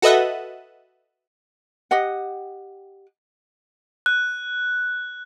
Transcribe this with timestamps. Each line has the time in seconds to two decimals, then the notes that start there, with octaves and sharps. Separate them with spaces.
0.02 F#4 A4 B4 D#5 E5 F#5
1.91 G4 D#5 F#5
4.06 F#6